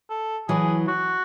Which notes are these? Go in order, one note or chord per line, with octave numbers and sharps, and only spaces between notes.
A4
E3 F#3 G#4
F#4